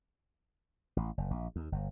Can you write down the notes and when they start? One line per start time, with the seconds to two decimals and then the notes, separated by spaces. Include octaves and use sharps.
0.97 A1
1.18 F#1
1.31 A#1
1.56 D#2
1.72 G1